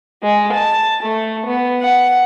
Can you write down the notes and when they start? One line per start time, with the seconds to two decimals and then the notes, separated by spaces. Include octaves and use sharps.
0.23 G#3
0.53 A5
1.03 A3
1.47 B3
1.82 F#5